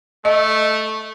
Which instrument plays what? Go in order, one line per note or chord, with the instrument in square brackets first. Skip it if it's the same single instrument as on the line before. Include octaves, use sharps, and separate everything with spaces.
[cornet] A3 [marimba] D#5